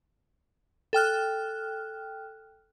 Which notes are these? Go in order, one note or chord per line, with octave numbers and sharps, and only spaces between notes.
A4 G5 F6 F#6